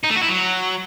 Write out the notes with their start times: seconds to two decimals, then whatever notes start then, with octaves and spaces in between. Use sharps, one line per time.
0.04 D#4
0.10 A3
0.16 F#4
0.22 E4
0.29 F#3